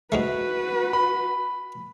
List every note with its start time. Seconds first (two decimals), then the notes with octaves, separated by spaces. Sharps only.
0.12 G#2 G#3 A3 F#4 B4
0.93 B5